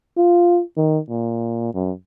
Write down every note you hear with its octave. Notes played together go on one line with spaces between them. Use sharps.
F4
D#3
A#2
F#2